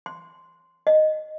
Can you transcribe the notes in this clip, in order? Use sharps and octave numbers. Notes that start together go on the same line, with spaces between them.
C6
D#5